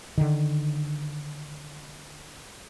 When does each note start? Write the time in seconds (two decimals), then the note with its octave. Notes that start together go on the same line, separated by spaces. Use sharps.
0.18 D3 D#3